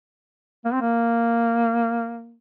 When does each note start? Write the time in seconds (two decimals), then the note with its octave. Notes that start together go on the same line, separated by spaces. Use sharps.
0.65 A#3
0.73 C4
0.81 A#3